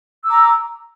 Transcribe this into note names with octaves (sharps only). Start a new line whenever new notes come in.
A#5 D6 E6